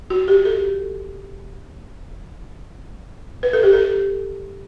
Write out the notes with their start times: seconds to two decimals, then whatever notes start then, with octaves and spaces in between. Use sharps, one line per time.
0.10 F#4
0.28 G4
0.45 A4
3.43 B4
3.53 A4
3.63 G4
3.73 A4